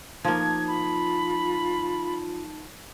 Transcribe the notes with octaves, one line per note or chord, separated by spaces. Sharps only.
F3 A#3 D#4 A5 G#6
F4 B5